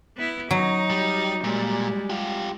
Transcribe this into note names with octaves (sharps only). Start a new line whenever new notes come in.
B3 E4
F#3 D#4
G3
A#2 G3 G#3
F4 G4